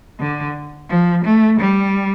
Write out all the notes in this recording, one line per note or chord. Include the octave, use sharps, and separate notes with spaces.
D3
F3
A3
G3